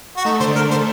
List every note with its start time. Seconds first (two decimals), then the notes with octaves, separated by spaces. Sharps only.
0.17 F#4
0.25 A3 D#4
0.40 D3 C5
0.55 A3 A#4
0.70 A3 C5